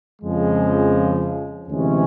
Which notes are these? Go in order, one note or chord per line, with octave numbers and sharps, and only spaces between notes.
F2 C#3 F3 G#3
D2 C3 E3 G#3 C#4